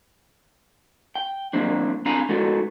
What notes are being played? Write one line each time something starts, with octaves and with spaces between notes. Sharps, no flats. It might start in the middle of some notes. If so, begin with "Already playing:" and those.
G5
F#3 A#3 C4 D4
C4 D4 F5 G#5 A#5 B5
G#3 B3 D#4 F#4 A4